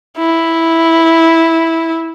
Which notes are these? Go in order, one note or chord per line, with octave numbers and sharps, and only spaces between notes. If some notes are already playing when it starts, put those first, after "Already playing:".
E4